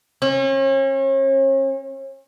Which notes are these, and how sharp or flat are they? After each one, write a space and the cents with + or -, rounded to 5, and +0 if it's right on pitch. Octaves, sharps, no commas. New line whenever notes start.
C#4 -40